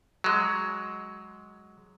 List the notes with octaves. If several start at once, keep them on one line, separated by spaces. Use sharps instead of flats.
F#3 G#3